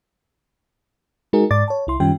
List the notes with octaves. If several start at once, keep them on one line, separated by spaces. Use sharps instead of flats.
G#3 D#4 F#4 G#4 A#4
G#2 D5 D6 A6
C#5 A5
C2 E4 C6
F#2 D#3 G3 C#4 F4 G5